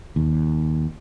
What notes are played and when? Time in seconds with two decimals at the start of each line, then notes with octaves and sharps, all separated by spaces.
0.16 D#2